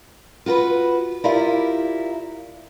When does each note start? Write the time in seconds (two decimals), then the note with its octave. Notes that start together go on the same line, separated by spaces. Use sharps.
0.46 F4 F#4 A#4 B4
1.24 E4 F4 G4 A#4 D5 F5